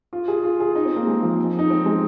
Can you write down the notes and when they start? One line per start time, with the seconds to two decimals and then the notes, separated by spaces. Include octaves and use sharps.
0.13 F4
0.28 G#4
0.44 F4
0.60 G#4
0.75 D#4
0.85 C4
0.96 A#3
1.07 G#3
1.23 F3
1.59 D#4
1.70 C4
1.86 G#3